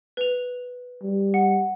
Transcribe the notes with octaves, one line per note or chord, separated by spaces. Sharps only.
B4 F7
G3
F#5